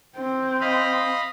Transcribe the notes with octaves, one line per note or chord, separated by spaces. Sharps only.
C4
D#5 F5 B5